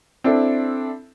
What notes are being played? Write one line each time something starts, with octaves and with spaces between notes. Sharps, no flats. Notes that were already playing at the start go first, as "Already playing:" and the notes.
C4 D4 E4 A4